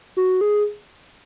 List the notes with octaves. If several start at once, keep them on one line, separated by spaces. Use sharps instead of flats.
F#4
G#4